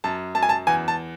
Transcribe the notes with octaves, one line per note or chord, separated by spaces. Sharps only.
F#2 A5
F#2 A5
G#5
A5
E2 G#5
A5